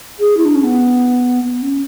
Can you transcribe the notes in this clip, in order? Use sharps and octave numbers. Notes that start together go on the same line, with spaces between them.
G#4
E4
D4
C#4
B3
B3
C#4